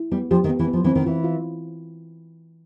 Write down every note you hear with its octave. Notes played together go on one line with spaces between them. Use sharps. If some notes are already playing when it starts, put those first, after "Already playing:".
Already playing: E4
G3 B3
F3 G4
D#3
B3
E3
B3
F3
E3 C4
D#3
E3 F4
F4